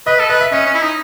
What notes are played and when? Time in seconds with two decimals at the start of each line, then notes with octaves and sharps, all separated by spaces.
0.06 B4 D#5
0.18 A4 D#5
0.29 B4 D#5
0.40 E5
0.52 C#4 D#5
0.66 C#4
0.74 E4
0.82 D#4